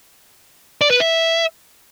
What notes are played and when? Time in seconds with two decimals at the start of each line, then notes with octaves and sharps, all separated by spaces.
0.81 D5
0.91 B4
1.00 E5